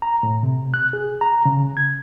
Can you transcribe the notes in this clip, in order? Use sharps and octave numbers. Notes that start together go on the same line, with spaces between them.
A#5
A2
C3
F#6
G#4
A#5
C#3
G#6